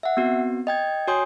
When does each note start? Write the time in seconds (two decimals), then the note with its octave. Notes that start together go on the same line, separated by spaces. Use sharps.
0.03 E5 F#5
0.17 B3 C4 F#4
0.67 D#5 G5 G#6
1.08 F#4 C#5 G#5 C6 D#6 G6